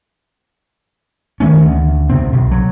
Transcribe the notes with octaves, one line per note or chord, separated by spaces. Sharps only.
D#3 A3 C#4
D2
D2 C3 C4
B1
F#3